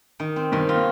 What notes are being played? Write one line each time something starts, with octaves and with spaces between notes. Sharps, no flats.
D#3
C4
G2 D#3 G3
F4
A#3